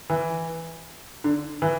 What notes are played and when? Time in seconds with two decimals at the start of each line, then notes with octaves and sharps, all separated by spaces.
0.10 E3
1.24 D3
1.62 E3